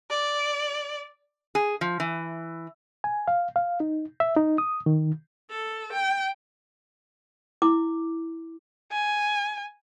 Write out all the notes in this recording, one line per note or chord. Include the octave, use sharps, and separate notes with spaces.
D5
G#4
F3
E3
G#5
F5
F5
D#4
E5
D#4
D#6
D#3
A4
G5
E4 D6
G#5